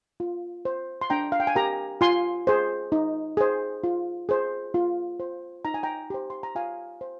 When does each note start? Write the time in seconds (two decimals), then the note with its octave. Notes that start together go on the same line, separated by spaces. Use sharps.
0.20 F4
0.65 C5
1.01 C6
1.10 D4 G5 A#5
1.32 F5
1.40 G5
1.47 G#5
1.55 G4 A#4 G5 A#5
2.01 F4 G#5 C6
2.47 G#4 C5
2.92 D#4
3.37 G#4 C5
3.84 F4
4.29 G#4 C5
4.74 F4
5.20 C5
5.65 D#4 A#5
5.74 G#5
5.83 G5 A#5
6.10 G4 C5
6.30 C6
6.43 A#5
6.55 F4 F5 G#5
7.01 C5